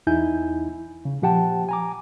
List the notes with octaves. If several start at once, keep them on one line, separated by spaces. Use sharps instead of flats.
E2 D#4 E4 G#5 G6
C#3
A#2 F3 G4 F#5 G5 A5
G#5 A#5 D6